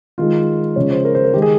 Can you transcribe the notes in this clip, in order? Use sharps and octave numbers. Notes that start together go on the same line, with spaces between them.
D#3 G#3 F4
C#3 F3 G#3 C#5
C5
A#4
C5
A#4
D#3 G#3 G4
G#4